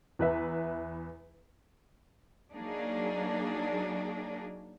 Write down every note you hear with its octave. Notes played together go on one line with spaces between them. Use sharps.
E2 B4 E5
F#3 A#3 D4 D#4 G#4